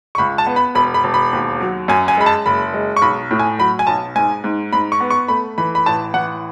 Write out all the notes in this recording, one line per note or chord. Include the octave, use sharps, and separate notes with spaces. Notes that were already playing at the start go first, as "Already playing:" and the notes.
C#6
C#2 B5
A5
B3
B5
E1 B5
B5
E1
B5
D#2
F#3
F#2 G#5
G#5
G#3 B5
A5
F#1 B5
G#3
C#6
B1 B5
A2
G#5
F#3 B5
G#5
B1 A5
G#2 G#5
G#2
G#2 B5
C#6
B3
C#6
A3 B5
E3 B5
B5
A1 A5
E3 F#5